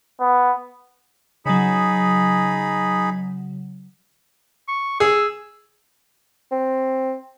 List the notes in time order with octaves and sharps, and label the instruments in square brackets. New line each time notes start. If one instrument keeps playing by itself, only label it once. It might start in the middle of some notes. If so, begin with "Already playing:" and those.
[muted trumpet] B3
[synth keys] C#3 F#3 [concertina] D#4 G#4 B5
[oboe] C#6
[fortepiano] G#4 [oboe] E6
[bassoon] C4